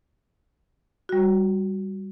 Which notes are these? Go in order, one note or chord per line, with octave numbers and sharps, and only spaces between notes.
G3 F#4